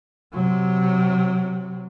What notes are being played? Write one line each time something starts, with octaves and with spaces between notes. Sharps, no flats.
C3 F#3